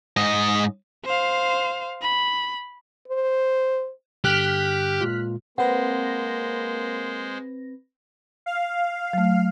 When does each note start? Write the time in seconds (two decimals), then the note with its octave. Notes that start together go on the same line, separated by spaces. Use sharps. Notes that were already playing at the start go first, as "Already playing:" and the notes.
0.17 G#2 D#5
1.05 C5 F5
2.01 B5
3.08 C5
4.24 G2 D3 G4 F6 F#6 B6
5.01 A#2 G#3 F4
5.58 G#3 A#3 C4 B4 C5 F#5 A#6
8.46 F5
9.13 F#3 A3